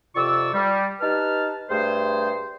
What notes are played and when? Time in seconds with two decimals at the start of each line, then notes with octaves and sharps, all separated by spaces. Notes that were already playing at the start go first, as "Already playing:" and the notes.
0.16 F2 C3 F4 D5 C#6 E6
0.54 G3
1.01 D#4 G4 B4 A5 F6
1.69 G2 A3 G#4 C5